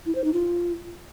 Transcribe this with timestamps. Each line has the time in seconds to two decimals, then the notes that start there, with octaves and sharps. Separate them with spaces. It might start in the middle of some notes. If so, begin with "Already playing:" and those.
0.06 E4
0.15 C5
0.24 D#4
0.33 F4